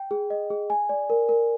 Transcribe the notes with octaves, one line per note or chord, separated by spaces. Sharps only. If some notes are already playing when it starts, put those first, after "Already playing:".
Already playing: G5
G#4
D#5
G#4
G#5
D5
A#4
A#4